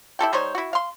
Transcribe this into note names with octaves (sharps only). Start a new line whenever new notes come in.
E4 G4 A4 G5
G3 D#4 C5 C#5
E4 F#4
F5 C6